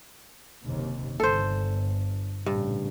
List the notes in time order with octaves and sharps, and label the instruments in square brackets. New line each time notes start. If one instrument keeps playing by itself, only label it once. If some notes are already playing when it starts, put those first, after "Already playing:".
[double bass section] F#1 D#2 C3
[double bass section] G1 [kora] A4 C5
[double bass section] A1 A#2 C#3 [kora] G2